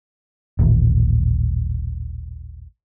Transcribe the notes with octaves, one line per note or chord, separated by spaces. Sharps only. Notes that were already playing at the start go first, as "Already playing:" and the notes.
D#1 A1